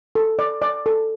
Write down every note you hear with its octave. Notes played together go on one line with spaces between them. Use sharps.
A4
D5
D5
A4